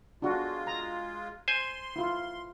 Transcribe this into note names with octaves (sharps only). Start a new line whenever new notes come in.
G#3 D4 F4 F#4
A#5
C5 G#5 C6
E4 F4